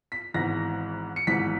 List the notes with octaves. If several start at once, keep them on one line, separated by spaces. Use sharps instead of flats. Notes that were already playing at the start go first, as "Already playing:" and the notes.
B6
G#1 G#2 E3 B3 A#6
C#7
G#1 G#2 E3 B3 B6